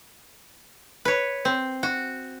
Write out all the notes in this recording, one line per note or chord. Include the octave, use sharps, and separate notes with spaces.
B4 C#5
C4
F#4